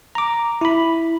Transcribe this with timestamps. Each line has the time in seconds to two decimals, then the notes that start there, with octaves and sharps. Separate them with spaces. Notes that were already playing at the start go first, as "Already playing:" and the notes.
0.15 A#5 D6
0.61 E4 B5